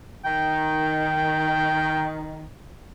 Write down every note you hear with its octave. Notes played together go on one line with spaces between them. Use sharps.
D#3 G5